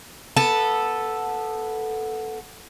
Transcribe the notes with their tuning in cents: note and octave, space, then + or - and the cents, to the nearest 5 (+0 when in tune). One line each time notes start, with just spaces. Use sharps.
B3 -15 A4 +0